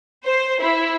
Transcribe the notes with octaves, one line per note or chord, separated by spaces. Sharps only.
C5
E4